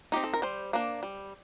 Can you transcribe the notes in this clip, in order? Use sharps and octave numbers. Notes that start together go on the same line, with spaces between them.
C4 D#4 G4
A4
A#4
G3 C5
A#3 D4
G3